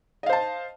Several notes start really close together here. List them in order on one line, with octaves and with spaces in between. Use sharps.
D#5 F5 C5 A5